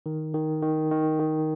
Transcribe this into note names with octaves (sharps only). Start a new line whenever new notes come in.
D#3
D#3
D#3
D#3
D#3